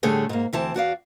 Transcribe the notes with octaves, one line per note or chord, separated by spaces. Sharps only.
A2 D3 G3 A3 G#4 C#5
G#2 A#3
D2 E3 C4 A5
E2 F#4 D5 F5